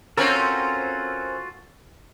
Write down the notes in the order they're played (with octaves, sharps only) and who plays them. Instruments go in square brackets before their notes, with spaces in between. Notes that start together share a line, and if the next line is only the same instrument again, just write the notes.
[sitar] C4 C#4 A#4 [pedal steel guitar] F4 F#4 A4